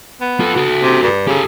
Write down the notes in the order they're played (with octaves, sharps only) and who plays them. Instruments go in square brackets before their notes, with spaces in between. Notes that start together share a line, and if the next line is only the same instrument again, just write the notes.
[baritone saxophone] B3
[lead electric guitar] F4 A4
F#4 A4
[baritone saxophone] C3
G2
[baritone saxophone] C#3 [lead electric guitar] G4 A4